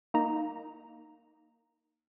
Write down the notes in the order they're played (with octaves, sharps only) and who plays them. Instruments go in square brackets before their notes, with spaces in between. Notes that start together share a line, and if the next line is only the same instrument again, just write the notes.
[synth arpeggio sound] A#3 D#4 A#5